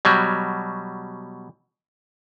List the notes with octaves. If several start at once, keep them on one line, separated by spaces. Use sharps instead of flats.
B2 F#3 G3